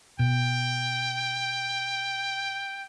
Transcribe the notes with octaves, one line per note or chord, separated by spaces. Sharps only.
B2 G5